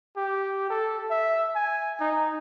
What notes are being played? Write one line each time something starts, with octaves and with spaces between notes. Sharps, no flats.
G4
A4
E5
G#5
D#4